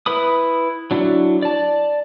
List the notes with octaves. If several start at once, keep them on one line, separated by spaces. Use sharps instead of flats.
E4 B4 B5 D#6
F#3 D4 E4 F#4
D5 A5